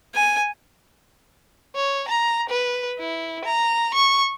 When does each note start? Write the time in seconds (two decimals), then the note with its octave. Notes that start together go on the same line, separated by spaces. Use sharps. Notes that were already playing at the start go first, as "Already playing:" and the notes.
0.14 G#5
1.76 C#5
2.08 A#5
2.49 B4
2.99 E4
3.45 A#5
3.94 C#6